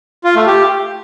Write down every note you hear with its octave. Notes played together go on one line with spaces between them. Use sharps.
F4
A3
G4